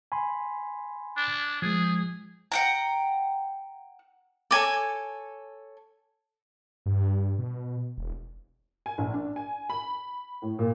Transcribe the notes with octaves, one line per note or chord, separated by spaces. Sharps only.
G#5 B5 C6
D4
F3 G#3 G#4
F#5 G5 A#5
A4 C#5 G#5 D6
G2
B2
E1
G#5
A#1
D4
G#5
B5
A2
A#2